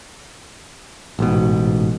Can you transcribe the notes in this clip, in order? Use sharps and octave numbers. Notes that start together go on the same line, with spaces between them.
A1 G#2 B2